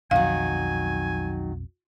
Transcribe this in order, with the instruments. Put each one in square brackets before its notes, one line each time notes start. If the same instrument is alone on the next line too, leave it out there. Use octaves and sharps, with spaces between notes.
[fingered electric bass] B1 F2 [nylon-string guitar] D#3 F#3 [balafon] F5 [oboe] G#5